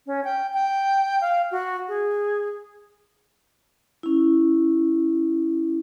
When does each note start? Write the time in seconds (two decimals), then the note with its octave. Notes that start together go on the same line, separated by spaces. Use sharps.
0.06 C#4
0.24 G5
0.53 G5
1.21 F5
1.51 F#4
1.88 G#4
4.03 C#4 E4